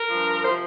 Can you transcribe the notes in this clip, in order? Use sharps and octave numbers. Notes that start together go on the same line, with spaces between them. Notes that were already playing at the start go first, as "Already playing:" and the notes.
Already playing: A#4
F3
G2
C3 F3 C5